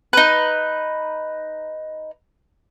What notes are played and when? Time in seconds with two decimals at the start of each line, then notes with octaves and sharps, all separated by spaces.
0.13 D#4 B4